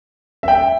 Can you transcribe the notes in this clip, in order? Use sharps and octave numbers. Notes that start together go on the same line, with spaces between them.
E5
G5